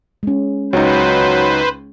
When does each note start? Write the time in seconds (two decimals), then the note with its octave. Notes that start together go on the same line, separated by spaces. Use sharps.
0.23 G#3 C#4
0.73 C#2 F#3 D#4 B4 C5